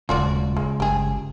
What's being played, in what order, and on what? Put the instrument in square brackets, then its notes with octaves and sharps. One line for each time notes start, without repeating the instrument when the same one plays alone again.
[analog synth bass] D#1 [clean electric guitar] C#2 [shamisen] F4 F#4 D5
[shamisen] G#3
[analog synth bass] G1 [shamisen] G4 G#4